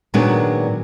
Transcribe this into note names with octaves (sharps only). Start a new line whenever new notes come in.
A#2 D#3 F#3 G#3 B3 D4